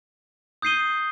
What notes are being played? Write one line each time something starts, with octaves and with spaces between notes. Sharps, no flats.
D#6 G6 C7 D#7 G7